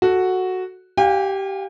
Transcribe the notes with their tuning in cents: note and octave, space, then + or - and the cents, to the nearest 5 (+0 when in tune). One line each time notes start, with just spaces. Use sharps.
F#4 +0 A4 +0 F#5 +0
G4 -15 F5 +15 G#5 -45